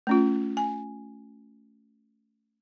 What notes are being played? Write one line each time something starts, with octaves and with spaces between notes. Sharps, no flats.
A3 C#4 F4
G#5